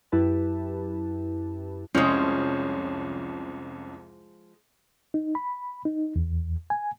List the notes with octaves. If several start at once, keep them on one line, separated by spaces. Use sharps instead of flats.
F#2 E4 G4 B4 A5
C2 F2 F3 G#3 C#4
D#4
B5
D#4
E2
G#5